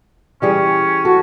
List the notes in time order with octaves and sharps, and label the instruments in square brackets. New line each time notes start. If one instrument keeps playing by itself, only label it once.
[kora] E3 G3 G#4 [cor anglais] C#4
[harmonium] F#4 [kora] A4